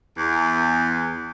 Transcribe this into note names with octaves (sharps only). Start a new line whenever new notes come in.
E2